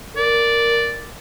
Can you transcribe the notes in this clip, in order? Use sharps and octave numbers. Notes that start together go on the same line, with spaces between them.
A#4 D5